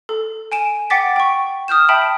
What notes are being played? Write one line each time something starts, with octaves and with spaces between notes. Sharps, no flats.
A4
G#5 D7 E7
F#5 G5 D6 A6 B6
G5 C#6
D#6 F6 G6 E7
E5 G5 A5 B5